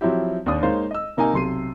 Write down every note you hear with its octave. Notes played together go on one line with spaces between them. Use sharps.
F3 F#3 C4 E4 G4
D#2 D4 D#6
G#3 A#3 D#4 C5 C#5 F5
D#5 E6
C3 A#3 D#4 A#4 D#5 G#5
B1 C3 C6 C7 D#7